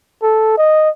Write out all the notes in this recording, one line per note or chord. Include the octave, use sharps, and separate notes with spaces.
A4
D#5